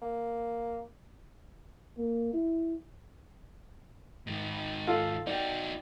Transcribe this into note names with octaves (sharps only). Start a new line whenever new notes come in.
A#3
A#3
E4
G#2 D#3
F4 A4 F5
D#4 F#4 D5 G5